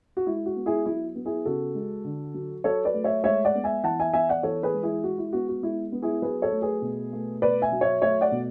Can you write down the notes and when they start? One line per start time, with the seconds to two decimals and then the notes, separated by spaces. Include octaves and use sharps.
0.17 F#4
0.26 G#3 E4
0.46 F#4
0.56 B3
0.66 E4 G#4
0.86 F#3 E4
1.15 B3
1.26 E4 G#4
1.46 C#3 F#4 A4
1.75 G#3
2.05 D3
2.34 F#3
2.64 F#3 A4 C#5
2.85 B4 D5
2.94 A3
3.04 C#5 E5
3.24 G#3 C#5 E5
3.45 D5 F#5
3.55 B3
3.64 E5 G#5
3.84 E3 F#5 A5
4.00 E5 G#5
4.13 B3 E5 G#5
4.29 D5 F#5
4.43 E3 A4 C#5
4.63 G#4 B4
4.74 G#3
4.83 E4 G#4
5.04 G#3 F#4
5.18 E4
5.33 B3 F#4
5.49 F#4
5.62 G#3 E4
5.92 B3
6.02 E4 G#4
6.22 F#3 G#4 B4
6.42 A4 C#5
6.52 A3
6.62 G#4 B4
6.82 B2
7.13 A3
7.42 B2 B4 D5
7.62 E5 G#5
7.72 F#3
7.81 C#5 E5
8.02 A3 C#5 E5
8.21 D5 F#5
8.32 B2